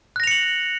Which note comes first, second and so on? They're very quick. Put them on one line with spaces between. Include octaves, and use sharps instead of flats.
F#6 A#6 F7 C#7 F#7